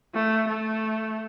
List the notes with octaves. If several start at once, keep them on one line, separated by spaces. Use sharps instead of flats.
A3
A3